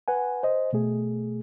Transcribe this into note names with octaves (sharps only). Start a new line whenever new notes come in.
B4 F#5 G#5
C5 D#5
B2 A3 G#4